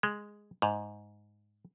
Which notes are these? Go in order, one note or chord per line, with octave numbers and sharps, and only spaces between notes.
G#3
G#2